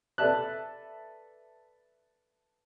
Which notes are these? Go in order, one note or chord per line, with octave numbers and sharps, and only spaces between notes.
A4 B4 D5 E5 A5 F#6